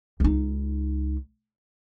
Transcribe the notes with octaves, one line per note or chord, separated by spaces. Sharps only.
C#2 D#4